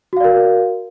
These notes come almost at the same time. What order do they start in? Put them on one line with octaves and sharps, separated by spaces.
F#4 F5 D5 A#4